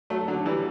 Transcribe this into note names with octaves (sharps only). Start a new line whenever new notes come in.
F#3 A3
D3 F#3
E3 G3